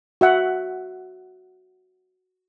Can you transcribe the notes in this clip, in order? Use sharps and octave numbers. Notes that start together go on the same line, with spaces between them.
F#4 E5 F#5